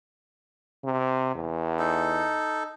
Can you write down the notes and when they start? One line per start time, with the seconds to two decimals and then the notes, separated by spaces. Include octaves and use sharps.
0.85 C3
1.35 E2
1.79 D#4 A4